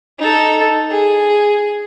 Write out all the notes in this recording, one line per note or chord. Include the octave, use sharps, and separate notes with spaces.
D#4 A4
G#4